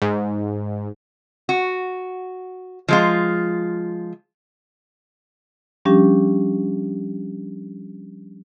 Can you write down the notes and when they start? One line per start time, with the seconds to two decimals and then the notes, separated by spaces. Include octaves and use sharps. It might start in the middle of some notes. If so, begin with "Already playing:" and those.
0.02 G#2
1.49 F#4
2.89 F3 G#3 F4
5.85 F3 G3 C#4 D4 G4